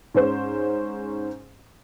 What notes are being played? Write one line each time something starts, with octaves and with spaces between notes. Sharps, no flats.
G#2 C#4 C5